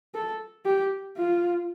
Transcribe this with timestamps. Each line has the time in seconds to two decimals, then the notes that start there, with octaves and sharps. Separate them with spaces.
0.14 A4
0.65 G4
1.17 F4